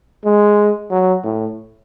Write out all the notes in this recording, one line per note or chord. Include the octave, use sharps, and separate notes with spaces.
G#3
F#3
A2